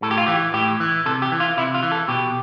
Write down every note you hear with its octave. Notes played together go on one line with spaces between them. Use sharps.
A2 A4
G4
F4
E3 G4
A2 G4
E3
C3 A4
G4
E3
F4
C3 E4
F4
E3
A4
B2 G4